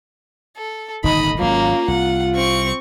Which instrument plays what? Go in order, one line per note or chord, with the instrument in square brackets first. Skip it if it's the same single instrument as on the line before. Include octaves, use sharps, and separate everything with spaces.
[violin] A4
[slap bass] D#1 G#1 D3 [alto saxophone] D#4 [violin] D#5 B5
[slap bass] G#1 F#3 [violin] A#3 C#4 [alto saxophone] F4
[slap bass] C2 [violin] F#5
[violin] C4 C#6